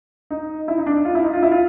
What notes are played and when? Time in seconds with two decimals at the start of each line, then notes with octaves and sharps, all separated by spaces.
0.31 D#4
0.68 E4
0.78 D#4
0.86 D4
1.05 F4
1.15 E4
1.24 D#4
1.33 F4
1.43 E4
1.52 F4